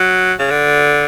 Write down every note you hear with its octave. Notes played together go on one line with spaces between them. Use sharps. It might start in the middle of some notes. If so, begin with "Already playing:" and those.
Already playing: F#3
C#3
D3